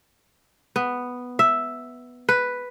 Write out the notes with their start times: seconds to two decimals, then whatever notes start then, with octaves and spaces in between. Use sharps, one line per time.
0.76 B3
1.39 E5
2.29 B4